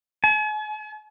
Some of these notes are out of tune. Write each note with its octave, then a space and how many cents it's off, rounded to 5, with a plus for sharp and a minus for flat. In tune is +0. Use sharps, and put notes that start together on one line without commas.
G#5 +45